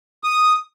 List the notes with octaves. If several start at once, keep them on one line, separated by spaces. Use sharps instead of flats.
D#6